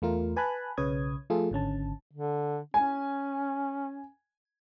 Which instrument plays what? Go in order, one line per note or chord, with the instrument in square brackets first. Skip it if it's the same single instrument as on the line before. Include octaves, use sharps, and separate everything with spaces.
[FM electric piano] E2 A3 F4 A#4
B4 G#5 A5 B5 F#6
B1 C#3 B4 C#5 D#6 G#6
F3 A3 F4 G#4 A4
G#1 D3 C#4 A5
[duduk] D3
[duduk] C#4 [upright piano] G#5